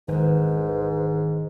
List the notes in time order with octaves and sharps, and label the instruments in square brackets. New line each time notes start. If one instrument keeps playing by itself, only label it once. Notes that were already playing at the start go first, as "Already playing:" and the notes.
[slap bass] G#1 E2 [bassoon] G#2 [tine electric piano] D#3 [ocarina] B4